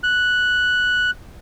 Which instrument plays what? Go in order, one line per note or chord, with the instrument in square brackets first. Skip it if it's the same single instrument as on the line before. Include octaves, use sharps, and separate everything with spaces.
[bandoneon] F#6